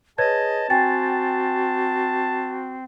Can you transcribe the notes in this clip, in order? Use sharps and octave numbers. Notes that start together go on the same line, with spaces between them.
G#4 B4 C#5 D#5 A5 G#6
C4 F#4 G5 G#5 A6